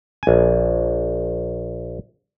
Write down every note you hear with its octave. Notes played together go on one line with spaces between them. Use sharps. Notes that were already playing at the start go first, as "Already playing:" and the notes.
A#1 G#5